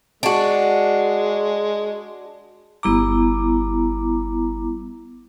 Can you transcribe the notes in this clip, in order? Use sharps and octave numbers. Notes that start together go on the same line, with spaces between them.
G#3 D4 F#4
G1 G3 B3 E4 A#5 D6